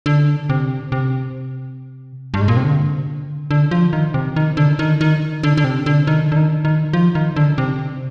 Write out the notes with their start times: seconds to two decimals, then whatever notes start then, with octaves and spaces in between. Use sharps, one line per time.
0.06 D3
0.50 C3
0.92 C3
2.34 G2
2.41 G#2
2.48 A#2
2.57 C3
2.64 D3
3.51 D3
3.71 F3
3.93 D#3
4.14 C3
4.36 D#3
4.57 D3
4.79 D#3
5.01 D#3
5.43 D3
5.57 D3
5.64 C3
5.86 D3
6.07 D#3
6.32 D3
6.37 D#3
6.65 D#3
6.93 F3
7.15 D#3
7.36 D3
7.58 C3